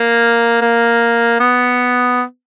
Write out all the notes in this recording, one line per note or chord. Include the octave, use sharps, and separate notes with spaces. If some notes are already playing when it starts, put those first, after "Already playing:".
Already playing: A#3
A#3
B3